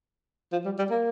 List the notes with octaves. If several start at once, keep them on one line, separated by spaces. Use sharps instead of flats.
F3
G3
G3
A#3